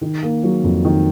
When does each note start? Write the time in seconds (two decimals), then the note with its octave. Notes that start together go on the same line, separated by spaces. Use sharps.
0.01 D#3
0.23 A#3
0.43 F#3
0.64 F2
0.85 D#3